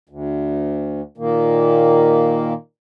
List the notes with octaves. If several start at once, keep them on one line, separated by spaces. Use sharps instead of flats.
D2
A#2 D#3 A#3